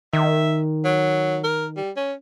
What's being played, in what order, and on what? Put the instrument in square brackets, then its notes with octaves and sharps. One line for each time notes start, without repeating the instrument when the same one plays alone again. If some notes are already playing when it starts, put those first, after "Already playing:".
[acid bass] D#3 [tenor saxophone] E5
[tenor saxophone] F#3
A#4
G3
C#4